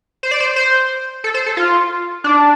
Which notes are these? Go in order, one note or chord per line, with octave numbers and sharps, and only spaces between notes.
C5
D5
C5
C5
A4
C5
A4
F4
D4